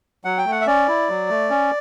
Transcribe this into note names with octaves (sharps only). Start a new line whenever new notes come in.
F#3 F#5
G5
A3
F#5
E5
C#4 D5
E4
F#3
A3
C#4